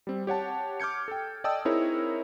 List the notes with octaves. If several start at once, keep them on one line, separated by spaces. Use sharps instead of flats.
G3 C4
G4 C#5 F#5 A5
D6 F6 G6 G#6 C#7
A4 G5
D5 D#5 G5 A5 D#6 E6
C4 D#4 E4 G#4 A#4 C#5